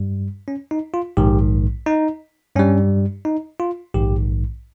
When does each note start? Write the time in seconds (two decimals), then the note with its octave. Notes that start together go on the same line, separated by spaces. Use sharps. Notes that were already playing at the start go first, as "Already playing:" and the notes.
Already playing: G2 G3
0.48 C#4
0.71 D#4
0.94 F4
1.17 A#1 G#2 D#3 G4
1.86 D#4
2.56 G2 G3 C#4
3.25 D#4
3.60 F4
3.94 A#1 G#2 D#3 G4